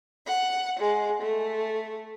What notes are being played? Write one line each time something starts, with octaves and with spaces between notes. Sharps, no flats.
F#5
G#3
A3